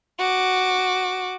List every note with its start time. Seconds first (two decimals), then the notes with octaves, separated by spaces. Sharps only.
0.19 F#4 D6